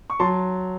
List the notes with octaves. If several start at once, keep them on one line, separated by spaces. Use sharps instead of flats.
C#6
F#3 A5 C6